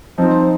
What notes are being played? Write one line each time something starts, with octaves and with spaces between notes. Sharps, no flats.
F3 C4 D#4